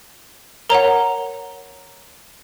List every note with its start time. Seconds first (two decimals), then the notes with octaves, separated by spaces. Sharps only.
0.70 A#4 C#5 F#5 A#5